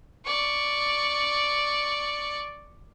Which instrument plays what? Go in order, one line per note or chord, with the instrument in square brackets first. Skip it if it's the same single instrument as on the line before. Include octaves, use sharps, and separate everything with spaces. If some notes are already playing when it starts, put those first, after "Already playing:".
[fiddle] D5 C#6